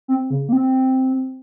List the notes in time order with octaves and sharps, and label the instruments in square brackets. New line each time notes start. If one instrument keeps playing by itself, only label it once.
[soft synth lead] C4
C#3
A#3
C4